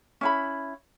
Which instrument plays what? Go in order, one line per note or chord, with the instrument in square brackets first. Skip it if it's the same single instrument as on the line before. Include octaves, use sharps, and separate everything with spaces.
[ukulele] C#4 E4 B5